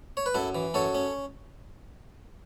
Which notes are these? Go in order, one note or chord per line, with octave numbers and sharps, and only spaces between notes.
C#5
B4
F#2 E4 A4
E3
F#2 A4 C#5
C#4